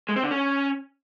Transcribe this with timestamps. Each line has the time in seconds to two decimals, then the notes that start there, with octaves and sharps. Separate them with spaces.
0.09 G#3
0.16 C4
0.23 D3
0.31 C#4